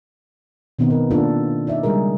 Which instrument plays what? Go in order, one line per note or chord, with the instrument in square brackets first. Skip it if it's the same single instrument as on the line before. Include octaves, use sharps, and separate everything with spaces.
[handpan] B2 D#3 B3 C4 D#4
A#4 B4
D#3 A#3 D4 F4 A4
D#4 D5 E5
C#3 G3 G#3 G#4 A#4